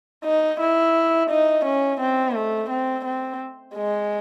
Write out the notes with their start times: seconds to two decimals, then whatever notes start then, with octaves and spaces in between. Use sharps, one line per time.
0.25 D#4
0.60 E4
1.30 D#4
1.65 C#4
2.00 C4
2.35 A3
2.70 C4
3.05 C4
3.75 G#3